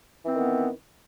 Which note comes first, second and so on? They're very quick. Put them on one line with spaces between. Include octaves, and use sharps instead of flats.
E3 C4 D#3 B3